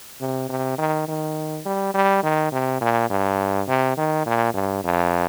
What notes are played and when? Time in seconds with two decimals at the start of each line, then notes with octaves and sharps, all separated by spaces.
0.21 C3
0.49 C3
0.78 D#3
1.08 D#3
1.65 G3
1.94 G3
2.23 D#3
2.52 C3
2.81 A#2
3.10 G2
3.68 C3
3.97 D#3
4.26 A#2
4.54 G2
4.84 F2